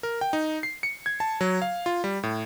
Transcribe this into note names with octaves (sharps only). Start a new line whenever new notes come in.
A#4
G5
D#4
C7
C#7
G#6
A5
F#3
F5
F4
G3
A2